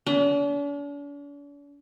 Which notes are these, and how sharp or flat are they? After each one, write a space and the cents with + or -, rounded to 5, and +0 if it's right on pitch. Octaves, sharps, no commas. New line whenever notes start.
D4 -45